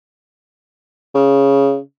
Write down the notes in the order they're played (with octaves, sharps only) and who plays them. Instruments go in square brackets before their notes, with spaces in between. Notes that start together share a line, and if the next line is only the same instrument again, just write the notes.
[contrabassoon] C#3